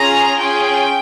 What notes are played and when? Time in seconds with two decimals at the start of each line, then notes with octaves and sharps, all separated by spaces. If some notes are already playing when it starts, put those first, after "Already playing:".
Already playing: C#4 F4 G#4 A#5
0.38 C#4 F4 G#4 G5